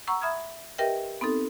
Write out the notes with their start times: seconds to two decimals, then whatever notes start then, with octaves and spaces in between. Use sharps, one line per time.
0.07 F#5 A#5 C#6 E6
0.22 E5 B5 D#6 F6 G#6
0.78 G4 A#4 B4 D#5 E5 G5
1.21 B3 C4 D#4 A4